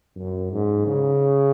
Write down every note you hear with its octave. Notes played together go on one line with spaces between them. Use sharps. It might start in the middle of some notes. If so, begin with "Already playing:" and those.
F#2
G#2
C#3